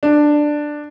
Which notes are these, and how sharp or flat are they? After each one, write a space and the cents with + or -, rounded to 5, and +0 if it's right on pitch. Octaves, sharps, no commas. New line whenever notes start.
D4 +10